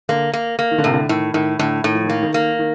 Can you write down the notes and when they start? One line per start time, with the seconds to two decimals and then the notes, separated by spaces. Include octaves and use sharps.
0.09 D3 A#3
0.34 A#3
0.59 A#3
0.71 D#3
0.78 D3
0.84 A2 C3
0.93 D3
1.09 A2 D#3
1.34 A2 D#3
1.59 A2 D3
1.84 A2 D#3
1.95 F3
2.04 D#3
2.10 A#3
2.23 D#3
2.34 A#3
2.59 D#3